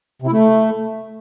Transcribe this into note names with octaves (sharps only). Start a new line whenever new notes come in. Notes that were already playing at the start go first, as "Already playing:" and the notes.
C3
E4
A3